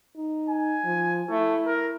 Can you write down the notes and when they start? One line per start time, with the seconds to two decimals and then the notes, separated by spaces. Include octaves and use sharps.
0.17 D#4
0.49 G#5
0.85 F3
1.29 A3 E4
1.67 A#4